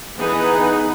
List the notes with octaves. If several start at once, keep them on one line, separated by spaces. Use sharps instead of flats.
E3 B3 D#4 G#4 B4